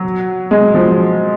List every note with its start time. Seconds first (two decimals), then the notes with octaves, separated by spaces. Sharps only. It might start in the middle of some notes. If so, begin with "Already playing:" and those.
Already playing: F#3
0.51 G#3
0.75 F3